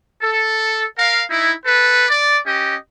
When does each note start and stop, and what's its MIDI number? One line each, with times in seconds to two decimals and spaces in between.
0.22 0.85 69
0.98 1.23 70
0.98 1.23 77
1.30 1.51 63
1.30 1.51 64
1.65 2.08 69
1.65 2.08 71
2.09 2.38 74
2.46 2.75 61
2.46 2.75 67
2.46 2.75 75